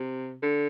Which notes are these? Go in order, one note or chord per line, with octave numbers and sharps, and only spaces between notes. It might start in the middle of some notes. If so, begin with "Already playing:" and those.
Already playing: C3
D3